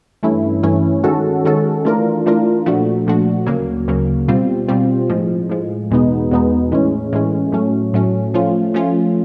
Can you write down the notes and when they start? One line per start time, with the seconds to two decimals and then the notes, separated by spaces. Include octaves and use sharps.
0.23 G2 E3 A3 C#4 E4
0.63 G2 E3 A3 C#4 E4
1.04 D#3 G#3 C#4 F#4 A4
1.45 D#3 G#3 C#4 F#4 A4
1.85 E3 A3 D4 F4 A#4
2.26 E3 A3 D4 F4 A#4
2.66 A#2 F3 A3 D4 F#4
3.07 A#2 F3 A3 D4 F#4
3.46 D2 C#3 F#3 A#3
3.88 D2 C#3 F#3 A#3
4.28 B2 G3 C4 F4
4.68 B2 G3 C4 F4
5.10 A2 F3 G#3
5.49 A2 F3 G#3
5.91 E2 B2 G#3 B3 D#4
6.31 E2 B2 G#3 B3 D#4
6.72 A2 E3 G#3 C#4
7.13 A2 E3 G#3 C#4
7.52 A2 F#3 A3 C#4
7.93 A2 F#3 A3 C#4
8.34 F3 A3 C#4 F4
8.74 F3 A3 C#4 F4